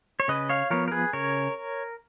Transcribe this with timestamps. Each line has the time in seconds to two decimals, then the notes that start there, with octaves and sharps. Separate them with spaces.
0.20 C#5
0.28 C#3 B4 D#5
0.49 C#5 F5
0.70 F3 B3 A#4 C#5
0.88 A#4
0.92 G#4 B4
1.13 C#3 A#4 C#5